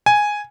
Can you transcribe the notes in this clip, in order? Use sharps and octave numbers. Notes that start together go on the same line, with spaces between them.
G#5